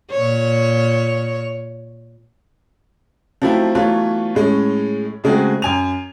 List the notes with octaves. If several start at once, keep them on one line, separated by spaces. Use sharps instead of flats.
A#2 C#5
F3 F#3 A3 C4 E4
E3 F#3 A3 B3 F4 C#5
A2 G#3 C#4
C#3 G#3 A3 C4 F#4 G#4
F#2 G#5 F7